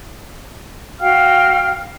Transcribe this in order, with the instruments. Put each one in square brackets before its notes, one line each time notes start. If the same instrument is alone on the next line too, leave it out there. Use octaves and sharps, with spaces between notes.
[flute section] F#4 F5 G5 F6